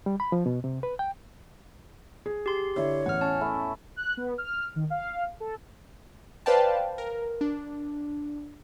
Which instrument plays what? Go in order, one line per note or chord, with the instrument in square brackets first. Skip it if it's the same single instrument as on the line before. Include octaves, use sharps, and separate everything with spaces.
[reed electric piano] G3
B5
F3
B2
C3
B4
G5
[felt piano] G#4
[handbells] G4 C6
[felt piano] D3 E4 E5 [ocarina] C#5
[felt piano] A1 E2 [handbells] F#5 F6
[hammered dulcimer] C#4 [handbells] A5
[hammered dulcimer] A3 E4
[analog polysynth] F#6
B3
F6
D#3
F5
A4
[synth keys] B4 C5 D5 F5 G5 A5
A#4
D4